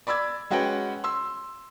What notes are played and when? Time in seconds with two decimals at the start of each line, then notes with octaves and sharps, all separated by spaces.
0.07 D5 B5 D6 E6 G#6
0.50 G#3 C#4 F#4 B4 F#5 G5
1.04 C6 E6